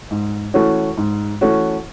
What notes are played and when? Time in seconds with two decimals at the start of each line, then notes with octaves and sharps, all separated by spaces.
0.11 G#2
0.54 E3 A3 C#4 F#4
0.97 G#2
1.41 E3 A3 C#4 F#4